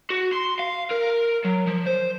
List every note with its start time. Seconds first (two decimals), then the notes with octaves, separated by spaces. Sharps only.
0.10 F#4
0.33 C6
0.59 F5
0.91 A#4
1.45 F#3
1.67 F3
1.87 C5